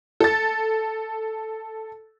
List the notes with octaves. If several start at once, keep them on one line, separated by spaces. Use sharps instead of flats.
A4 A6